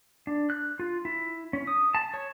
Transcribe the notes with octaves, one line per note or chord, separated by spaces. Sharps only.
D4
F#6
F4
E4
C#4
D#6
A5
C#5